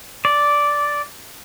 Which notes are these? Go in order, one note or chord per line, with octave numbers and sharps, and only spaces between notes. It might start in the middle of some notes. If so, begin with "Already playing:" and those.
D5